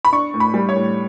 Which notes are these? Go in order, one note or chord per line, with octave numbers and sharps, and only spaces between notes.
B5
D4 C#6
A2
B5
G3
C#5
A2